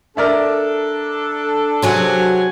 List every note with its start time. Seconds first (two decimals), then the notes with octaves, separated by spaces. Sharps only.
0.17 D4 A4 A#4 D5 E5
1.82 C3 F#3 G#4 F#5 G#5